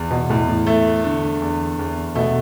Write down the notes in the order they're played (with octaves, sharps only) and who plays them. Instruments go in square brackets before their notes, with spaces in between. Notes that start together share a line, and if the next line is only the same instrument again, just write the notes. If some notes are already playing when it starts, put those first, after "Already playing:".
Already playing: [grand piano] E2
[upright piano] B2
[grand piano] E2 [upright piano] A2
[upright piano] A2
[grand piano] A3
D3
E2
E2
[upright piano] B2 [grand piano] A3